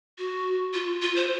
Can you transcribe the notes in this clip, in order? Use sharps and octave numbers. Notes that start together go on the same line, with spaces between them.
F#4
F4
F4
C5